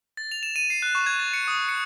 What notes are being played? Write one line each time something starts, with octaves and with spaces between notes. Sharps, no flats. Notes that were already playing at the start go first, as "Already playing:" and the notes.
A6
F7
E7
D#7
C7
F#6
C#6
G#6
A6
C#7
D#6
C#7